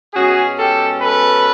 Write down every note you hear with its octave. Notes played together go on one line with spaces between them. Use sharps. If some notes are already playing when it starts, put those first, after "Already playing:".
B2 G#3 C#4 F#4 G#4
G4 A4
A4 B4